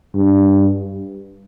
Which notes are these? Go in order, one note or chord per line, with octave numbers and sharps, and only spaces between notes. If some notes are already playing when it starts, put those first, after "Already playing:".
G2